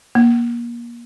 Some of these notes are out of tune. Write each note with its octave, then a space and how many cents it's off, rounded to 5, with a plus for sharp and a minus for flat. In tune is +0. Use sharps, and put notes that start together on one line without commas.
A#3 +25